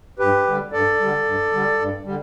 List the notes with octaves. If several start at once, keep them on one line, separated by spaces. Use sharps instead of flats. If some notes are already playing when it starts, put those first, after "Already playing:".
G2 G4 B4
D3 G3
G2 A4 D5
D3 G3
G2
D3 G3
G2
D3 G3